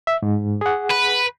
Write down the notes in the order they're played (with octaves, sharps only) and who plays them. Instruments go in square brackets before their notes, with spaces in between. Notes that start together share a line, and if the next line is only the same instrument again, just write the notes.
[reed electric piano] E5
G#2
G#4 F#5
[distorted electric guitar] B4